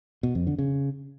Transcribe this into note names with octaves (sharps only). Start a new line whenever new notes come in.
B2
F2
D3
C#3